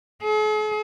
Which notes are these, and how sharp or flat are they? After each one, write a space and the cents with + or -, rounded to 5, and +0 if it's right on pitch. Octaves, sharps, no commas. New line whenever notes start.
G#4 +45